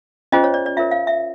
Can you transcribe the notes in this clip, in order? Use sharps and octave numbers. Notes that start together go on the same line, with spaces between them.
C#4 F4 G#4 C5 D#5
C#5
D5
D5
F4 A#4 C#5 E5
F5
E5